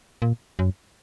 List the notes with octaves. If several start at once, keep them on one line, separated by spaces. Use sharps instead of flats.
A#2
F#2